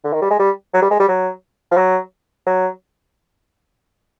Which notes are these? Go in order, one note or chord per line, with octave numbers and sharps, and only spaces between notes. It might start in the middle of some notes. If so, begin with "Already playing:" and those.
D3
D#3
G3
G#3
G3
F#3
G3
G#3
G3
F#3
F3
F#3
F#3